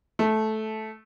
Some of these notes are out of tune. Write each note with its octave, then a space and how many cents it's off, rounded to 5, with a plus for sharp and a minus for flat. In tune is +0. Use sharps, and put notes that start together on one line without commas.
A3 -15